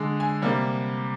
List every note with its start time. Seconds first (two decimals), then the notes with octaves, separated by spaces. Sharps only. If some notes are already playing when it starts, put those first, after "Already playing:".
Already playing: D3 G#3
0.20 G#5
0.42 C3 G3 A#3